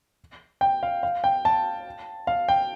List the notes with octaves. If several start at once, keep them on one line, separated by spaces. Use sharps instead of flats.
G5
F5
F5
G5
A5
F5
G5